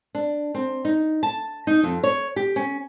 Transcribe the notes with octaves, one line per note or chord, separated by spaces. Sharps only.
D4
C4
D#4
A5
D#4
F2
C#5
G4
C#4